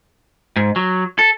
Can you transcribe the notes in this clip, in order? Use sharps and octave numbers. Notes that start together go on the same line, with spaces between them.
G#2
F#3
A4